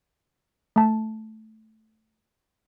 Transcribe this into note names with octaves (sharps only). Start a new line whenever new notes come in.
A3 A5